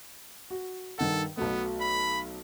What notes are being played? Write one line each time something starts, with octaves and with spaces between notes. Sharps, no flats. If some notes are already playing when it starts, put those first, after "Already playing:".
F#4
G2 D#3 A4 F#5
B1 F#3 A3 B3
B5